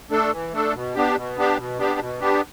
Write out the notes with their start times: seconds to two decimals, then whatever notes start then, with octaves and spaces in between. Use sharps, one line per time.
0.11 A3 D4 A4
0.32 E3
0.53 A3 D4 A4
0.74 B2
0.95 B3 D4 G4
1.16 B2
1.37 B3 D4 G4
1.57 B2
1.78 B3 D4 G4
1.99 B2
2.20 B3 D4 G4